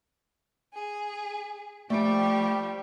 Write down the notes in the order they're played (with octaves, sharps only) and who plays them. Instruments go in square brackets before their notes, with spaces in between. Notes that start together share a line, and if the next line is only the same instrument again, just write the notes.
[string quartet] G#4
[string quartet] F3 G3 G4 [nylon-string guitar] A3 G5